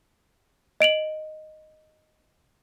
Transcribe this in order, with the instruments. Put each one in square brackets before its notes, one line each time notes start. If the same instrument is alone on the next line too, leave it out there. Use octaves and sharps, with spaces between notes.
[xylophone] D#5 D7 F7 F#7